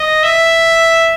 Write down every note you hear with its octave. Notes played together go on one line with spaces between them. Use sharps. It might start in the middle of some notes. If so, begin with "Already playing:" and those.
Already playing: D#5
E5